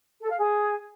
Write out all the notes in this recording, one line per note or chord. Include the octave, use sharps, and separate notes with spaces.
A4
F5
G#4